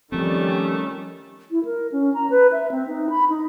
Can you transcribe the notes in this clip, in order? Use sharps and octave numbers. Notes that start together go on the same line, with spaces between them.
D#3 F3 G3 A3 C4 C#4
E4
A#4
C#4
A#5
B4
E5
C4
D#4
B5
D#4